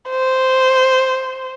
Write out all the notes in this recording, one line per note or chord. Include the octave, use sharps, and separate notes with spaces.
C5